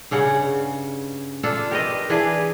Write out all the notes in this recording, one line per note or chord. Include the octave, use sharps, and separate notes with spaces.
G2 C#3 C#4 F#5
D4 F4 A4
G4 A#4 B4 D#5
E3 D4 G#4 B4